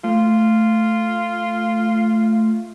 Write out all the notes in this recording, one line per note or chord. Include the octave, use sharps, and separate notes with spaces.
A3 F4